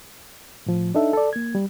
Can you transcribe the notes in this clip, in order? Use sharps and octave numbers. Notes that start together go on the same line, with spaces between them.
A2 F3
D4 D#4 A4 E5
A4 D5
A#3 G#6
G3